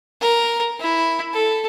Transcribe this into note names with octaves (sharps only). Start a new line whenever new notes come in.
A#4
E4
A4